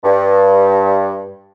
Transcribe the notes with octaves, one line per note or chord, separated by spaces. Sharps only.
G2